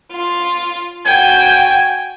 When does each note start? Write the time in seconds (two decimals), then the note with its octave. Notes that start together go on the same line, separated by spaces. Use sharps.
0.12 F4
1.06 F#4 G5 G#5